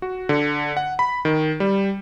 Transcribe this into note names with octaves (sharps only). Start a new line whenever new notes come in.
F#4
D3
F#5
B5
D#3
G3